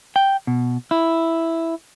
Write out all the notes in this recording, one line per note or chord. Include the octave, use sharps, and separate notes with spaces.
G5
B2
E4